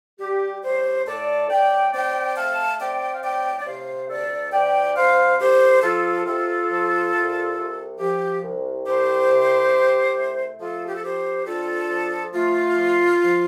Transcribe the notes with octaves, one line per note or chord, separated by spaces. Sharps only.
G3 G4
A2 G4 C5
A2 A4 D5
A2 D5 G5
C4 D5 G5
A3 F5 A5
C4 D5 G5
F5
A2 D5 G5
D5
C3 C5 F5
D2 A4 D5
D2 D5 G5
D2 C5 F5
C2 G4 C5
F3 F4 A4
C3 F4 A4
F3
C2
C2
F3 G4
C2
C2 G4 C5
C3
C2
A3
F3 F4 A4
G4
A4
F2 G4 C5
D4 F4 A4
F3
A3 F4
F3
F3